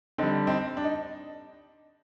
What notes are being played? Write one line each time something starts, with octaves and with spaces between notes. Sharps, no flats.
D3 G3 C4 D#4
C4 D#4
D4
D#4